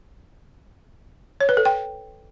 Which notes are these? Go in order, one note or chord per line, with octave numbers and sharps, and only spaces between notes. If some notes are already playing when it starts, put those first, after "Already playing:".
C#5
B4
A4
G5